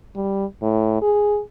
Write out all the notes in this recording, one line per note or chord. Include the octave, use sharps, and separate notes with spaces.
G3
A2
G#4